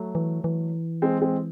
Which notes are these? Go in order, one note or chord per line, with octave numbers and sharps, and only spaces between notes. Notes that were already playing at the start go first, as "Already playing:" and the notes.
Already playing: F#3 A3
E3
E3
G#3 C4
G#3 C4